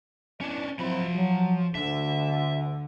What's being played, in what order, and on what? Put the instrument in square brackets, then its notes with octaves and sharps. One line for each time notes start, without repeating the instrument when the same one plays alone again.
[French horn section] B3 E4 D5 [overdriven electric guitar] C#4 D4
[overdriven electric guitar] F3 B5 [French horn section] F#3 C4 E4
[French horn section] F#3
[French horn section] D2 [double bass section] D3 [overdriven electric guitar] E5